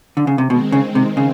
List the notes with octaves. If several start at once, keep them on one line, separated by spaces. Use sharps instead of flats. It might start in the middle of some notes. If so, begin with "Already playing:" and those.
D3
C#3
C3
B2 D#3 G#3 C4
C#3
C3
C#3